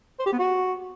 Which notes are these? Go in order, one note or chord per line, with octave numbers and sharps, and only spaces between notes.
C5
G4
B3
F#4